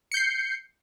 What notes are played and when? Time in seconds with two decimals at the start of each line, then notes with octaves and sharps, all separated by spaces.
0.12 C#7
0.14 G6
0.17 C7